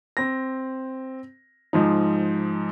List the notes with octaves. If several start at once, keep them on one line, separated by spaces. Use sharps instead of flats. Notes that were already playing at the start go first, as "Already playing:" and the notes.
C4 A#6
G#2 F3 D#4